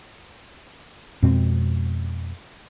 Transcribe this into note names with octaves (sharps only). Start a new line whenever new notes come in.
F2 B2 G#3 C4